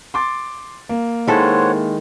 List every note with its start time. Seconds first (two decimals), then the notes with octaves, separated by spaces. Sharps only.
0.14 C6 D6 A6
0.89 A#3
1.28 D#3 G#3 E4 A4 C5 C#5 F#5